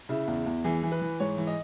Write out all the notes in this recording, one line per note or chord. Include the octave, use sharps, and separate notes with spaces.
C#3 E4
E2
E2
E3 G#4
E3
B4
E3
G#2 C#5
E3
D#5